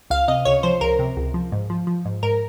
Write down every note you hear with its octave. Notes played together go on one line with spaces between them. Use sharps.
C#2 F5
C3 D#5
C#2 C#5
F3 C5
C#2 A#4
C3
C#2
F3
G#2
F3
F3
G#2
G#2 A#4